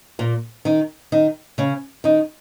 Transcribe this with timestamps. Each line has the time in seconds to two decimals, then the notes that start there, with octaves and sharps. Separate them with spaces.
0.19 A#2 A#3
0.65 D#3 D#4
1.12 D#3 D#4
1.58 C#3 C#4
2.04 D#3 D#4